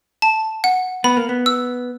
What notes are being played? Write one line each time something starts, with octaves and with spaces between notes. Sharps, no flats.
A5
F#5
B3 B5
A#3
B3
E6